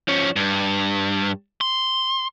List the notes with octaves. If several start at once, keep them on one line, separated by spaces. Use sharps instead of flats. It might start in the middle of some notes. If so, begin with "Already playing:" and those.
F3 C#4
G2
C6